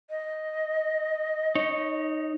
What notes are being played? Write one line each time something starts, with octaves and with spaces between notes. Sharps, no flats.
D#5
D#4 C#5